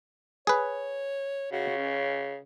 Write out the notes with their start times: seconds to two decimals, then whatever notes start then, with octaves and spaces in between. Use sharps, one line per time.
0.47 G#4 B4 C#5
1.52 C#3 F#4
1.78 C#4